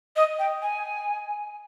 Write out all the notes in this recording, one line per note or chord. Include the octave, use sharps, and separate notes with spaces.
D#5
G5
G#5